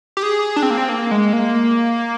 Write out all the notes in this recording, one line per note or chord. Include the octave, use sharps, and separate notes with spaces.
G4
G#4
D4
C4
A#3
C4
A#3
G#3
A#3